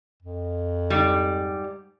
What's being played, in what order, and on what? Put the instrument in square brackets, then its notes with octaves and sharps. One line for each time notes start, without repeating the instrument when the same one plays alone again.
[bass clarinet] F2
[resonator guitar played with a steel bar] G#2 G3